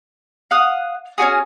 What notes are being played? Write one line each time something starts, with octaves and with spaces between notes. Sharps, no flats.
F5 F#5 D#6
C#4 D4 F#4 G#4